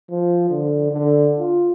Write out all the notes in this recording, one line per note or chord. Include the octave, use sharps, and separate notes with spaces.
F3
D3
D3
F4